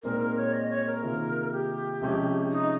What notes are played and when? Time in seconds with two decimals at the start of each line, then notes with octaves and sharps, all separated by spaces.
0.03 A#2 G#3 C4 D#4 A#4
0.20 A#4
0.37 C#5
0.53 D#5
0.70 C#5
0.86 A#4
1.03 C3 D#3 A#3 F4 G#4
1.52 G4
2.02 C3 F3 G#3 C#4
2.52 D#4